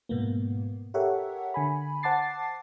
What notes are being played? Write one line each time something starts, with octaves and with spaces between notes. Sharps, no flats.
G#2 B2 A#3 B3
G4 A4 A#4 C#5 E5 F#5
D3 G#5 B5
C5 F#5 A5 D6 A6 C7